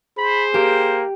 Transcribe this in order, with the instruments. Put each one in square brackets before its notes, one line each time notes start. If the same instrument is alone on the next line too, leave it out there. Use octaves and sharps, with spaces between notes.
[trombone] G#4 [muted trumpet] C5 [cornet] B5
[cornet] A#3 [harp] G4